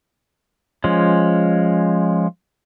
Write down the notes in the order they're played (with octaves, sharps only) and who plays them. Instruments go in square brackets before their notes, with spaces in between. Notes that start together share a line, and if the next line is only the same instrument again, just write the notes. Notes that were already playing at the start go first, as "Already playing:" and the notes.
[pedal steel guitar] F3 G#3 C#4